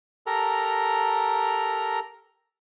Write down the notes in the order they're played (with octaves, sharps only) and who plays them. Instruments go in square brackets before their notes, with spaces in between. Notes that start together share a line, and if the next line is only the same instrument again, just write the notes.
[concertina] G4 A4 A#4 A#5